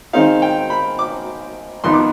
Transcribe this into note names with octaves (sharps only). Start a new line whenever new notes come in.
D#3 G#3 C4 D#4 F5
G5
B5
D6
F2 D#3 B3 D#4 C6
D6